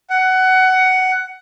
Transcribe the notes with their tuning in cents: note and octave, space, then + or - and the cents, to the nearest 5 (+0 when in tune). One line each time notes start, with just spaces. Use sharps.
F#5 +15